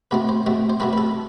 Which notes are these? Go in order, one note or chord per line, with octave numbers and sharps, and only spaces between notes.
B2 A3 C4 B4
C5
B2 A3 C4
C5
B2 A3 C4 B4
B4
A4